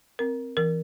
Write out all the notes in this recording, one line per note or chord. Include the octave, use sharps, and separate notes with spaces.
C4 A#4
E3 A#4